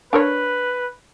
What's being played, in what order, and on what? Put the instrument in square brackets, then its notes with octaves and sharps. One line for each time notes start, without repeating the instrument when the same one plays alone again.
[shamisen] D4 A#4 C#5 [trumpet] B4